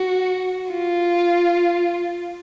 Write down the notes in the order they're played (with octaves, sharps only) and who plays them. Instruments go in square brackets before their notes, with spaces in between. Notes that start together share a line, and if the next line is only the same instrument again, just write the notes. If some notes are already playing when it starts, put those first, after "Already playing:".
Already playing: [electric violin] F#4
F4